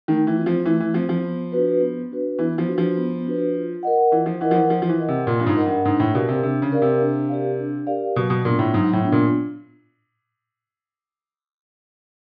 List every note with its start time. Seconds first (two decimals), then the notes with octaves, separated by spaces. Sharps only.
0.08 D#3 A3
0.27 E3
0.36 C4 F4
0.46 F3
0.66 E3 A3
0.80 E3
0.94 F3 C4 F4
1.09 F3
1.24 B3
1.52 D4 F#4 B4
1.81 B3
2.11 D4 F#4 B4
2.39 E3 B3
2.58 F3
2.67 D4 F#4 B4
2.78 F3
2.97 B3
3.26 D4 F#4 B4
3.54 F4
3.83 A#4 D#5 F#5
4.12 E3 F4
4.26 F3
4.40 E3 A#4 D#5 F#5
4.51 F3
4.55 E3
4.69 F3 F4
4.82 F3
4.89 E3
4.98 A#4 D#5 F#5
5.08 C3
5.27 A#2 F4
5.39 G2
5.46 G#2
5.56 A#4 D#5 F#5
5.66 G2
5.85 G#2 D4
6.00 A2
6.14 B2 G4 A#4 D5 F5
6.29 C3
6.43 C3 D4
6.62 C#3
6.71 G4 A#4 D5 F5
6.82 C3
7.01 D4
7.29 G4 A#4 D5 F5
7.58 D4
7.87 G4 A#4 D5 F5
8.16 B2 F#3
8.30 B2
8.45 A#2 B3 D4 F4
8.59 A2
8.73 G#2 F#3
8.93 A2
9.02 B3 D4 F4
9.12 A#2